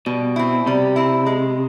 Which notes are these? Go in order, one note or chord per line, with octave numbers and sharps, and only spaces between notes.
B2 G3
C4 E4
C3 G3
C4 E4
G#3